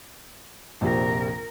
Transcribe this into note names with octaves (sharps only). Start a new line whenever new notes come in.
A#1 F2 C3 A#4